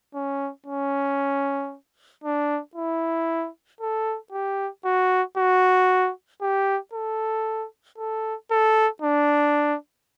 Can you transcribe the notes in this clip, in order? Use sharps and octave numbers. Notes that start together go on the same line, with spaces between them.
C#4
C#4
D4
E4
A4
G4
F#4
F#4
G4
A4
A4
A4
D4